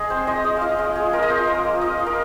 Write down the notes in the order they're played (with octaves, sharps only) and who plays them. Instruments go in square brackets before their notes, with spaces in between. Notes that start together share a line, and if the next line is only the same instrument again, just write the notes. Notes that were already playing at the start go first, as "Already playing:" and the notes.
Already playing: [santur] G#3 G#4 D#5
C4 C5
G#3 D#5
G#3 D#5
F4 D#5 F5
G#3
F4 G#4
G#3 A#4
D#5
F4 C5
F4 A#4
A#3
F4 D#5
F4
A#4